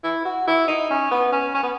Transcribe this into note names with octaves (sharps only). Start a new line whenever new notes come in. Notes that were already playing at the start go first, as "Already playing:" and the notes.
E4
F#4
E4
D#4
C#4
B3
C#4
C#4
B3